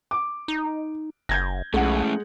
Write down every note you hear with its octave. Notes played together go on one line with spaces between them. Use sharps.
D6
D#4
F#1 G6 G#6 A#6
B1 G#3 A3 C#4 E4 F#5